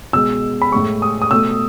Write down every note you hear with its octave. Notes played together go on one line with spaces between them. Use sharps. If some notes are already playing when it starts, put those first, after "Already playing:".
B2 G#3 E6
B5
A2 G#3 C#6
D#6
D#6
B2 A3 E6